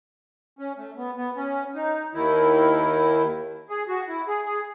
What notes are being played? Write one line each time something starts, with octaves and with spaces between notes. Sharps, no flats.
C#4
A3
B3
B3
C#4
D#4
D#2 D#3 E4
G#4
F#4
E4
G#4
G#4